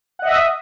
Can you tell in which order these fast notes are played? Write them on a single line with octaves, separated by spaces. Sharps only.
F#5 D#5 E5 D#6